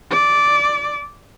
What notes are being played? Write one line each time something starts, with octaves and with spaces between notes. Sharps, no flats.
D5